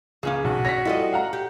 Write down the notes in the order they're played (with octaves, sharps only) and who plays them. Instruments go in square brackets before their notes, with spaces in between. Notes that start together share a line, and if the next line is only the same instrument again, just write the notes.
[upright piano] C#2 [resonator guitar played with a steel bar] A#3 C#4 G#4
[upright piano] B1 [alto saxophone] F#4
[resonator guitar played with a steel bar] C#5 D5 [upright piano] A#6 B6
[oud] G3 A4 D#5 [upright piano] E4 F4
[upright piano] F5 F#5 A#5
[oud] G4